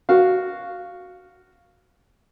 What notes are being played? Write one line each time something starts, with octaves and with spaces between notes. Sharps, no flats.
F#4 F5